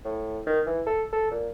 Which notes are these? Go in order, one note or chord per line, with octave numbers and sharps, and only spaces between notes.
A2
D#3
E3
A4
A4
A#2